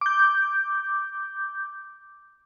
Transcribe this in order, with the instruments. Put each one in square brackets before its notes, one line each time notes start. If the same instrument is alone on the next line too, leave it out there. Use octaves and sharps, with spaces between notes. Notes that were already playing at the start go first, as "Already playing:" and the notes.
[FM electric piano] D6 G6